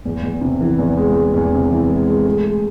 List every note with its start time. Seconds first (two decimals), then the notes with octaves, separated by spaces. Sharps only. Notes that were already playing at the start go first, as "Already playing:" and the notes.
0.05 E2
0.23 E2
0.41 C3
0.61 E3
0.79 E2
0.97 G#3
1.15 G#3
1.34 E2
1.53 C3
1.70 E3
1.89 G#3
2.07 G#3
2.25 A3
2.44 A3